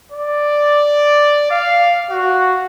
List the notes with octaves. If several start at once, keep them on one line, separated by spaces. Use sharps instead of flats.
D5
F5
F#4